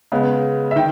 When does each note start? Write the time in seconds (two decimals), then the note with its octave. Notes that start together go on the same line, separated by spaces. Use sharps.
0.12 C#3 G#3 B3
0.71 E5
0.76 D#3 G5